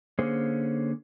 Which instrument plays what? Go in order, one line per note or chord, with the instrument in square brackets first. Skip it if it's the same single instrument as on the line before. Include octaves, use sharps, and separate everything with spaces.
[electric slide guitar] D3 A#3 C#4 G#4 C5